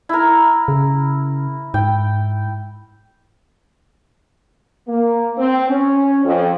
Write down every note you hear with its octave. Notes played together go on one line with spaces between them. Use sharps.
E4 A#4
C#3
G#2 G5
A#3
C4
C#4
F2